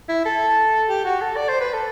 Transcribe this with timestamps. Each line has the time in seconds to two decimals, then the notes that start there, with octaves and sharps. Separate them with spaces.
0.09 E4
0.25 A4
0.90 G4
1.05 F#4
1.21 A4
1.36 D5
1.49 C5
1.60 B4
1.73 A4